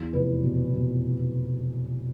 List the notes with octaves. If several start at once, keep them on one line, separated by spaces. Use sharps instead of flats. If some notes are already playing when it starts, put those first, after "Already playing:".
Already playing: E2
F1 B4
B2
B2